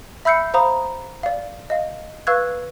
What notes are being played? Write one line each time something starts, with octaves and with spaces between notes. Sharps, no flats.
E5 B5 E6 G6 C7 C#7
C5 F5 A#5 B5 D#6
D5 F5
D#5 F5
B4 F5 C#6 E6 F#6 G#6